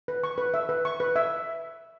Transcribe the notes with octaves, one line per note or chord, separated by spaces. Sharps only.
B4
C#6
B4
E5
B4
C#6
B4
E5